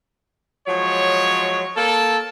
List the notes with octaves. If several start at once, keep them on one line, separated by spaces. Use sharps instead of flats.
F3 F#3 G#3 C#5
A#3 A4